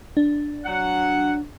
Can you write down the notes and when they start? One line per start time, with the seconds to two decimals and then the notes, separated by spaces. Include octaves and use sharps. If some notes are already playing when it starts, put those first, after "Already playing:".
0.17 D4
0.65 F#3 F#5